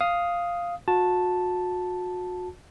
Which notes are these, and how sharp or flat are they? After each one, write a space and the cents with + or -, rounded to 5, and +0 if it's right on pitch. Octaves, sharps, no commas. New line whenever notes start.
F5 +0 D#6 +5
F#4 -35 A5 +0